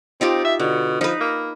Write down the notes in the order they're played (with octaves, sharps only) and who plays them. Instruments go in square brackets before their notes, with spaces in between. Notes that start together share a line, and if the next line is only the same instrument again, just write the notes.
[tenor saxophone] C4 [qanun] D#4 F4 G4
[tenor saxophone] E5
[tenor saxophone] B2 [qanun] D3
[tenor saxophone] F3 [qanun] D#4 B4
[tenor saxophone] A#3